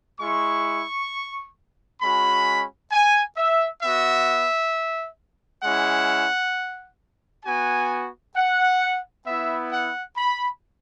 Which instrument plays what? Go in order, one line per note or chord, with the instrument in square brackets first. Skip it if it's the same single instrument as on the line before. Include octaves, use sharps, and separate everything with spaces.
[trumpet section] G#3 E4 C#6
G#3 C#4 F#4 B5
G#5
E5
B3 F#4 E5
G#3 C#4 E4 F#5
B3 F#4 G#5
F#5
B3 E4 E5
F#5
B5